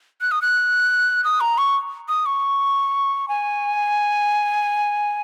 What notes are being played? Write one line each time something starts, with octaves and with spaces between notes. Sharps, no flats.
F#6
D#6
F#6
D#6
A#5
C#6
D#6
C#6
G#5